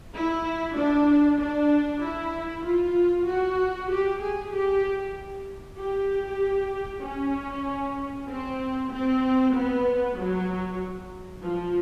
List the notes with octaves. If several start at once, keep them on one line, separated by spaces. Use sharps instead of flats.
E4
D4
D4
E4
F4
F#4
G4
G#4
G4
G4
C#4
C4
C4
B3
F#3
F3